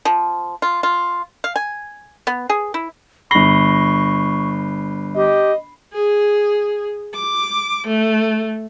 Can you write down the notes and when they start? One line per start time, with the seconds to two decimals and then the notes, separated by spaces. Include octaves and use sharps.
0.05 F3
0.62 F4
0.83 F4
1.44 F5
1.56 G#5
2.27 B3
2.49 G#4
2.74 E4
3.31 G1 B5 C#6 A#6 C7 G7
5.16 G4 D#5
5.92 G#4
7.14 D6
7.87 A3